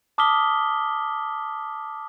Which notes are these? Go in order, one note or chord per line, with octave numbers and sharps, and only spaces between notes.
A5 D6 D#6 F6 B6 G7